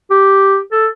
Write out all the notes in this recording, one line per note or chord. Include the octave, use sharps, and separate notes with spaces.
G4
A4